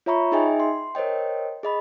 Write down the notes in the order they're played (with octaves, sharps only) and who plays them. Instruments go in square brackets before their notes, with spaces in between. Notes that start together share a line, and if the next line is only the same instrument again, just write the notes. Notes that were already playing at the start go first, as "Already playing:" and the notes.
[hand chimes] F4 C#5 E5 A#5 B5 C#6
D#4 G#4 D#5 E5 G5 G#5
C6
A#4 C5 C#5 D#5 G5
G#4 D#5 B5